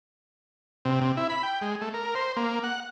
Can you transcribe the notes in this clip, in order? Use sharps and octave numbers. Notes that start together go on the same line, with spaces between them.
C3
C3
E4
B5
G5
G#3
A3
A#4
C5
A#3
F#5